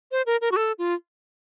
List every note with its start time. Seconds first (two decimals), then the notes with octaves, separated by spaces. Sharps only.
0.12 C5
0.26 A#4
0.41 A#4
0.52 F#4
0.56 A4
0.79 F4